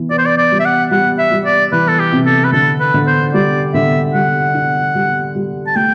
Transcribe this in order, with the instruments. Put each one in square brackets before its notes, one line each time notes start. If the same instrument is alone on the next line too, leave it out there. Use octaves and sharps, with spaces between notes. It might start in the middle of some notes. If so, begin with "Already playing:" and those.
Already playing: [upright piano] E3 B3
[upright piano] B3 [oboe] D5
[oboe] C5
D5
D5
[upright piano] G3
[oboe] E5
F#5
[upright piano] G3 [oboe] F#5
[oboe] E5
[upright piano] G3
[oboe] D5
[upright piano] E3 [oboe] B4
[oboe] A4
G4
[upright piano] C3
[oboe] A4
B4
[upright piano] D3 [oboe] A4
[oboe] B4
[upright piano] D3
[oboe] C5
[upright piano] G3 [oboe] D5
[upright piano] D3 [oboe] E5
[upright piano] G3 [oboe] F#5
[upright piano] D4
G3
G3
[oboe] A5
[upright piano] A3 [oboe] G5